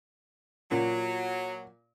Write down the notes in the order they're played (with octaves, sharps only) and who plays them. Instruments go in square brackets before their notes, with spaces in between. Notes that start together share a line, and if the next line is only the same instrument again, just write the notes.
[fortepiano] A#2 [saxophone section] F#3